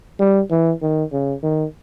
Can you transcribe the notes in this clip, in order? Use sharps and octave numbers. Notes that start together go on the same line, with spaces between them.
G3
E3
D#3
C#3
D#3